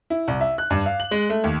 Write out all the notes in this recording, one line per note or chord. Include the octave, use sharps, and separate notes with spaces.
E4
C2
E5
F#6
G2
F5
F#7
G#3
A3
D#2